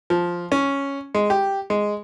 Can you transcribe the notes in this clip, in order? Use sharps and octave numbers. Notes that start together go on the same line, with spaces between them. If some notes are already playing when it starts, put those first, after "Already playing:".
F3
C#4
G#3
G4
G#3